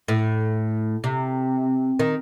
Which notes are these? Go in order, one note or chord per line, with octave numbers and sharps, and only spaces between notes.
A2
C3
D#3